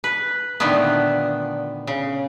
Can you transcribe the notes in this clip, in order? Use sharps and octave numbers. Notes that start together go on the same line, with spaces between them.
B4
A#2 D3 D#3 A3 B3
C#3